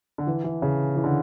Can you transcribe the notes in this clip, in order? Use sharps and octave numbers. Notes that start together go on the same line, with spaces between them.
D3
E3
E3
C#3
E3
D3